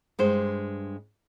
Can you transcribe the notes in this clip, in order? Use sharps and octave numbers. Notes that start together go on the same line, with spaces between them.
G2 G#3 C5